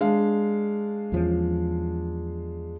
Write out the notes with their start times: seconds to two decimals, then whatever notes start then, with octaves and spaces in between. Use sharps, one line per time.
0.01 G#3 D4 F5
1.12 E2 F3 C#4